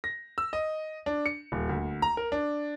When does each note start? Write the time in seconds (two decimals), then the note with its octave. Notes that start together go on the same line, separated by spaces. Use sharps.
0.04 A#6
0.38 E6
0.53 D#5
1.06 D4
1.26 C#7
1.52 D#1
1.69 D2
2.02 A#5
2.17 A#4
2.32 D4